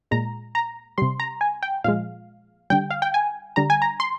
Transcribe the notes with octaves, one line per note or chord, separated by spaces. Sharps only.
A#2 G#3 A#5
A#5
C3 G3 C6
A#5
G#5
G5
A#2 F3 G#3 F5
D3 G3 G5
F5
G5
G#5
D3 G3 A#5
G#5
A#5
C6